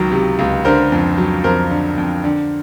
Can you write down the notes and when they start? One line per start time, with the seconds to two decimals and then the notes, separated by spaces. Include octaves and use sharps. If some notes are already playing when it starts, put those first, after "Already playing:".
Already playing: C#2 D#3 F#3
0.11 C3
0.39 C#2
0.65 D3 A#4 C5
0.92 F2
1.18 F#3
1.44 F2 A#4 C5
1.70 D3
1.98 F2
2.24 D3